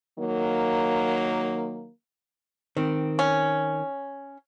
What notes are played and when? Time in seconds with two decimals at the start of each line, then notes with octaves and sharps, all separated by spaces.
0.19 D#3 F#3 A#3
2.77 D#3 C4
3.19 C#4